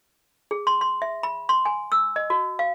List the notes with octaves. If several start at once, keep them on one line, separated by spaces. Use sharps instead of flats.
G#4
C6
C6
E5
B5
C6
G#5
E6
D#5
F#4
F5